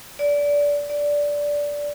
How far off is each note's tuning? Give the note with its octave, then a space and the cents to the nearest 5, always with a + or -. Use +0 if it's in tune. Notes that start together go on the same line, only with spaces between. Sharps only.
D5 -20
D5 -10